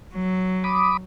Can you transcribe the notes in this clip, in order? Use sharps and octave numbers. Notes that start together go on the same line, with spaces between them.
F#3
B5 D6 D#6